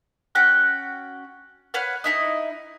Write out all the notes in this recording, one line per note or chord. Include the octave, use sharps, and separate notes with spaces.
C#4 F#4 G5 F#6
B4 C#5 F5 F#5
D#4 E4 D#5